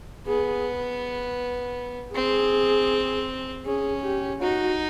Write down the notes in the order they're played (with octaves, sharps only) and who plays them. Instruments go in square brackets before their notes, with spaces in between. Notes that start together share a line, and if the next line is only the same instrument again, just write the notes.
[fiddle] B3 [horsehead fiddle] G#4
[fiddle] C4 [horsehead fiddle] G#4
[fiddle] C#4 [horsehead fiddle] G#4
[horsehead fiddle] G4
[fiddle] D#4 [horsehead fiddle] F#4